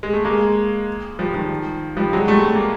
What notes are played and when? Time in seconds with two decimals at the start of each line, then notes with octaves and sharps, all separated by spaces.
0.03 G#3
0.13 A3
0.25 G#3 A#3
1.19 F3 G3
1.34 D#3 F3
1.97 F3 G3
2.13 F#3 G#3
2.28 G3 A3
2.45 A3
2.55 A#3